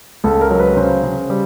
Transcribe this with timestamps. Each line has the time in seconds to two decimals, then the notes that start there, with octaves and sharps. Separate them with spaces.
0.24 C#2 A4
0.41 A#4
0.50 F#3
0.59 B4
0.77 C#3 C5
1.03 C#3
1.30 G3